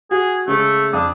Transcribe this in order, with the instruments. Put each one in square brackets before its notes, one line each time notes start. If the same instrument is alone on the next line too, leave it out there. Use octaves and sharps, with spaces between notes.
[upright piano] F#4 [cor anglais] G#4
[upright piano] C#3 G#3 [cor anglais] A3
[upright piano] F2 F5 D#6 [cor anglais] D4